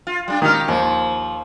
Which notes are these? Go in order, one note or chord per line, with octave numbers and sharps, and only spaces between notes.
F4
G3 D4 F4
D#3 D#4 G4 F6
D#2 F3